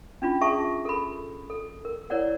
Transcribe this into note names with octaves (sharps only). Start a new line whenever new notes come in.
C#4 D4 F4 B5
G#4 E5 A5 C#6 D#6
A4 A#4 B5
A4
A#4
E4 A#4 C#5 D5 F#5